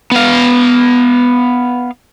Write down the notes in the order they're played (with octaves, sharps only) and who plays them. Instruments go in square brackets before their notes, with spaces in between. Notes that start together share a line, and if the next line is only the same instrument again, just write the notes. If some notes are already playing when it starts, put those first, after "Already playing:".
[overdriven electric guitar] B3 F5